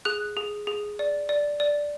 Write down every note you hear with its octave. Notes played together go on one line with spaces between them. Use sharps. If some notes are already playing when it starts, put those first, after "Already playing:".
G#4 F#6
G#4
G#4
D5
D5
D5